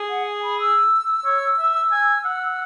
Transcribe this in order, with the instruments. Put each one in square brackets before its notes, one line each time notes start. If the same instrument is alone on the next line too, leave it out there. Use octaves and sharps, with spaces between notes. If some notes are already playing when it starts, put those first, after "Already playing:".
Already playing: [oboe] G#4
[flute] F#5
G#5
B5
E6
[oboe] C#5
E5
G#5
F#5